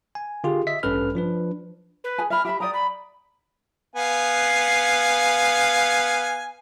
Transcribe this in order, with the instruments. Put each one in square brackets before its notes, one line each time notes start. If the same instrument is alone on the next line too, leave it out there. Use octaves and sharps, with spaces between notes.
[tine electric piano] G#5
D3 F4 G4 G#4
D#5 E5 B6
A1 G2 C#4 A4 B4 F6
F3 D4 B4
[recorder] B4
[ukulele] G#4 G#5
[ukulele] E5 B5 [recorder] F6
[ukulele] G4 B5 [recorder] E5
[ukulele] D5 G5 A#5 [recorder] D#6
[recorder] B5
[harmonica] B3 F5 G#5